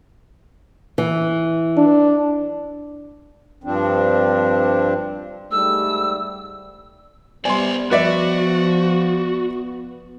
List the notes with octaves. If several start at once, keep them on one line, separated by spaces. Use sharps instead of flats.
E3
D4
G2 F3 C4 D4
G#2 G3 A3 E6
G3 B3 C5 D5 G#5 C6
F3 F#4 B4 D5 E5